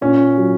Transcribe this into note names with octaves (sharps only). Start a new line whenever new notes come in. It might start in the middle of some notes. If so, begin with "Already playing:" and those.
A#2 C#4
F#3